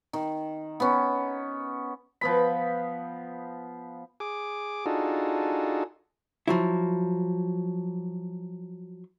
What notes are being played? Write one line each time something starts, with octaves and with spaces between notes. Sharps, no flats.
D#3
B3 C#4
F3 B3 B5
G#4 D6
D4 D#4 F4 F#4 G#4 A4
F3 F#3 E4